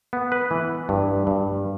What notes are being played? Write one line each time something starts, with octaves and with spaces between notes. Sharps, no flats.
B3
B4
E3
G2
G2